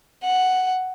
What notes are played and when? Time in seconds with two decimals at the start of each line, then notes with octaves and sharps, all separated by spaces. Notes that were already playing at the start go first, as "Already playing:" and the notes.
0.23 F#5